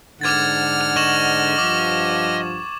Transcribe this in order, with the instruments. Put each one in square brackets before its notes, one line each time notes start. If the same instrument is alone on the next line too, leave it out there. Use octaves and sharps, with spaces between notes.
[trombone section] G#2 D3 [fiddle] F#5 F6 [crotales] D6 G#6 A6
[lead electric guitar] D#5 [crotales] C#6 E7 F#7
[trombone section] G2 F3 [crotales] D6